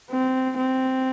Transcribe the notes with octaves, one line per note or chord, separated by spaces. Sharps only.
C4
C4